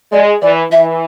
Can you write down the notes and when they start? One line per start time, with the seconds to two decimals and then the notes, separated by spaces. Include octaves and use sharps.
0.12 G#3 D5
0.42 E3 D5
0.72 E3 E5